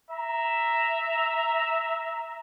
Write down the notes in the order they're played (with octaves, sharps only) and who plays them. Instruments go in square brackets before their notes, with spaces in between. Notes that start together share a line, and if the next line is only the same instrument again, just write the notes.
[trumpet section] E5 A#5